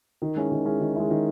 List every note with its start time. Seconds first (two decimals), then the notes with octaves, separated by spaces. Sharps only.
0.22 D#3
0.36 G#3 C#4 E4
0.52 D#3
0.66 G#3 C#4 E4
0.81 D#3
0.96 G#3 C#4 E4
1.10 D#3